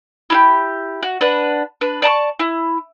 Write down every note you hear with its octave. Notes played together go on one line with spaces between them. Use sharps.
E4 F4 G4
F#4
D4 B4 F#5
D4 B4
D5 A5 A#5 C#6
E4